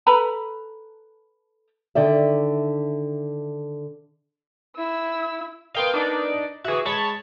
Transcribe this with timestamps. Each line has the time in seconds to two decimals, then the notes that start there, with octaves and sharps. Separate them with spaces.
0.07 A4 B4 A#5 B5
1.95 D3 D#3 D5 E5
4.76 E4 E6
5.75 B3 A#4 D#5 F5 G5 C6
5.94 D4 D#4 D5
6.65 E3 F#4 G#4 E5
6.86 G#3 C#5 A5 B5